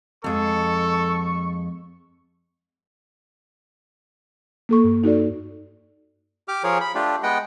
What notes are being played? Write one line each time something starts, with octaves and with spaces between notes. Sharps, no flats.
F2 G#3 A4 C#6
A#3 A4 C#6
G2
D#4 F#4 A4 D5
G4 D6 F6
F3 G#4 A#4 C#5
B5
A3 D4 F4 G4
G#3 B3 D#5 F#5 G5